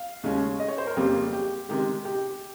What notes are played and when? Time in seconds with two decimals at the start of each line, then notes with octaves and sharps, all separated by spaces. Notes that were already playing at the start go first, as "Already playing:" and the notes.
Already playing: F5
0.23 D#2 C#3 G#3 C#4
0.60 D#5
0.68 C#5
0.78 C5
0.87 A#4
0.97 F2 C#3 G3 A#3 G4
1.33 G4
1.69 C3 D#3 G#3 G4
2.05 G4